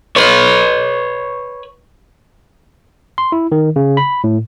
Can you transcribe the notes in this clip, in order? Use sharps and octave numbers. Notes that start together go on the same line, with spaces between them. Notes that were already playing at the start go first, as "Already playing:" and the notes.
B4 C#5
C6
E4
D#3
C#3
B5
A2